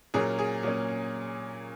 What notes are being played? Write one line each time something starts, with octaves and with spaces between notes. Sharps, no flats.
A#2 F#3 A#3 C#4 G#4
G#4
A#2 F#3 A#3 C#4